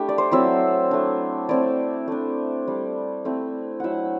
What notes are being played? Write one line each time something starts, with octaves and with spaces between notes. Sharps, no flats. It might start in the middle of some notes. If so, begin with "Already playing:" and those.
Already playing: A3 D4 E4 G4
D5
C5
F#3 C4 E4 E5
A3 D4
A3 C4 E4 D5
A3 D4
G3 D4
A3 C4 E4
F#3 A3 E4 E5 F#5